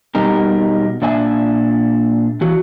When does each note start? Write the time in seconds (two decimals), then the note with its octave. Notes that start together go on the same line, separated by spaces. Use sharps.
0.15 B2 G3 D#4 A#4
1.02 A#2 D4 E5 G#5
2.41 E3 F#4